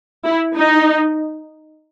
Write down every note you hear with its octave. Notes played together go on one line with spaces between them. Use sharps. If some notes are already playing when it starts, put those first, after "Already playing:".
E4
D#4